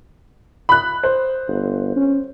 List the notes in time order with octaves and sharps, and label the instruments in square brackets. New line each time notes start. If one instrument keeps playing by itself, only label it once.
[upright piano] B5 F#6
C5
[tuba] G1
C#4